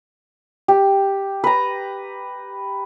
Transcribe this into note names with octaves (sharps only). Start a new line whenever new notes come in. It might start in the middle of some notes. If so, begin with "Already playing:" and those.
G4
B4 A#5